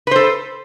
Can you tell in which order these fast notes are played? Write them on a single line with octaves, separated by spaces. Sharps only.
B4 C5 A4